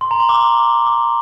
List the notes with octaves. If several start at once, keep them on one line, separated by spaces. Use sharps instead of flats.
C6
A#5
C6
D6
D6